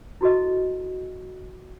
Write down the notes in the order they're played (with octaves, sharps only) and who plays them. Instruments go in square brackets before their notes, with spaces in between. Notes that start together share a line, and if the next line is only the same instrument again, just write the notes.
[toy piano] E4 F#4 A4 D#5